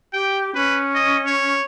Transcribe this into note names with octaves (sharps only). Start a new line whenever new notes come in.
G4 G5
C#4 B4
D#5
C#5